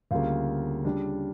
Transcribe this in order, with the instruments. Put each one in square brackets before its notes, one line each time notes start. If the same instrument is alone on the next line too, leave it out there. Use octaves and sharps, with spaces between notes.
[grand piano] D2 C#3 G3 A#3 F4 F5
C#3 G3 D4